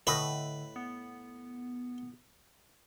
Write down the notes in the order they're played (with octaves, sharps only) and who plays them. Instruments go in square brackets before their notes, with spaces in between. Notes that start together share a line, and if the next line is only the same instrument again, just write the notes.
[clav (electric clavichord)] A2 D#5 [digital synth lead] D3 [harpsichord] B4
[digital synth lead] B3